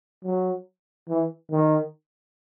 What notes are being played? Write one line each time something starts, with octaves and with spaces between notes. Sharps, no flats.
F#3
E3
D#3